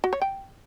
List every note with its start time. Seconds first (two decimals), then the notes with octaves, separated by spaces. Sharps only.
0.04 F#4
0.13 C#5
0.22 G5